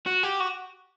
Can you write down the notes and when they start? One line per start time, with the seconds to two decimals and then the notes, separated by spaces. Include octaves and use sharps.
0.07 F#4
0.23 G4
0.40 F#4